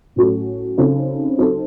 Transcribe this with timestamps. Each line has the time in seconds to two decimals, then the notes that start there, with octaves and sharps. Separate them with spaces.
0.16 A2 F#3 C#4 F#4 A4
0.78 C#3 F#3 C4 D#4 A4
1.38 F#3 C4 D#4 A4